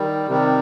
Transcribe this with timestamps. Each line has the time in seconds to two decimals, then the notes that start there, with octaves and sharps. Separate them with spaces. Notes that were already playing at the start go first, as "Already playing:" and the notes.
Already playing: D#3 G3
0.29 C3 D#3 G3